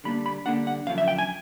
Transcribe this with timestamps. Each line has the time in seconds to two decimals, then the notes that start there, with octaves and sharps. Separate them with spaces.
0.04 D3 G3 A#3 D4 B5
0.26 B5
0.46 D3 G3 A#3 D4 F#5
0.67 F#5
0.87 F#2 D3 F3 F5
0.98 E5
1.08 G5
1.18 G#5